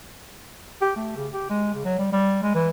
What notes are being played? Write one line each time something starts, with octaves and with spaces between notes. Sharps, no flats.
G4
A3
C#3
G4
G#3
C#3
F#3
G3
G3
G#3
E3